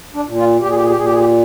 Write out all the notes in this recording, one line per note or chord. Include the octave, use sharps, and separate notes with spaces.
D4
A#2
F4
A#2 G4
G#4
G4
G#4
G4
A#2 G#4
G4
G#4
G4